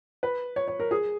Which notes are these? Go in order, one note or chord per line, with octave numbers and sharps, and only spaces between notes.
B4
C#5
C#5
A#4
G#4